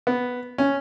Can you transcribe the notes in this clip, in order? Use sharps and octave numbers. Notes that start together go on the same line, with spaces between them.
B3
C#4